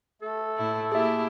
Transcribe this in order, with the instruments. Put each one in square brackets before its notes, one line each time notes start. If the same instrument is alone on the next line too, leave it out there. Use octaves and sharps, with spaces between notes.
[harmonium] A3 [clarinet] A4
[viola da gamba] A2 E4
[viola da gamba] A#3 E4 G4 [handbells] G#4 E5